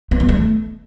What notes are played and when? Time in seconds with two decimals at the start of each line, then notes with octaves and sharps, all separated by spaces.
0.11 B3
0.20 E3
0.29 A3